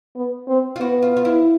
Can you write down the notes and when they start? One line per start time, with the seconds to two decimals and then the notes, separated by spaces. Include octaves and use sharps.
0.16 B3
0.48 C4
0.76 F4
0.80 B3 F#4
1.02 F4
1.17 F4
1.25 E4